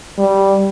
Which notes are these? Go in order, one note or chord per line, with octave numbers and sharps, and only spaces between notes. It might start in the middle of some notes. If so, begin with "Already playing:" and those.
G3